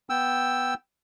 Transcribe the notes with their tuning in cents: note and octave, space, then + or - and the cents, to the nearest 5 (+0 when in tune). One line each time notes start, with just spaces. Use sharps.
B3 +0 G5 +0 E6 +0